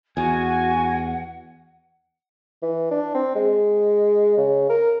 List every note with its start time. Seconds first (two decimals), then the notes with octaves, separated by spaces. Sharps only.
0.17 E2 F#4 F#5 G#5
2.62 E3
2.91 D4
3.15 C4
3.35 G#3
4.38 C#3
4.70 A#4